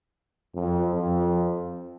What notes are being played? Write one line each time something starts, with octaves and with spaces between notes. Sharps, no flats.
F2
F2